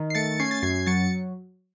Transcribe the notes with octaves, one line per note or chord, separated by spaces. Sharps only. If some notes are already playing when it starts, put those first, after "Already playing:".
Already playing: D#3
C7
A3 A6 C#7
C#4 G#6 C7
A6
F#2 G#6 C7
F#3 A6 C#7